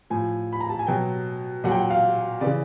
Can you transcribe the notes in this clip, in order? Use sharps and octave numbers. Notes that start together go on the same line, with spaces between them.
A2 F3 G#5
B5
A#5
A5
G#5
B2 F#3 G5
A#2 F#3 F#5
G5
F#5
F5
C#3 E3 D5